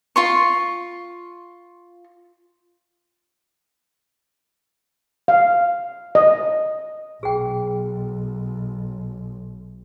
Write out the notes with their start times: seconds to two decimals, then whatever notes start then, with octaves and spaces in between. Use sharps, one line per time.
0.16 F4 C6 C#6
5.28 F5
6.15 D#5
7.23 B1 G#4 G5